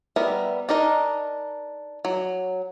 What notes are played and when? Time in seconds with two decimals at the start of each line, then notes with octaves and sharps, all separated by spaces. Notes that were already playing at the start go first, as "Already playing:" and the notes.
0.16 G3 B3 A#4 E5
0.69 D4 D#4 A#4 D#5
2.05 F#3